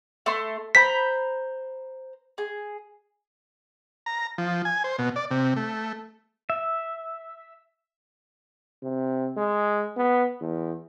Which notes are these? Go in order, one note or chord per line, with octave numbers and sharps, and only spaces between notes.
A3 C6
C5 A#5 B5 B6
G#4
A#5
F3
G#5
C5
B2
D5
C3
A3
E5
C3
G#3
B3
E2